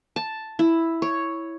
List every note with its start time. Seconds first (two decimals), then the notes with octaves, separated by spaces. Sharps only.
0.16 A5
0.59 E4
1.02 C#5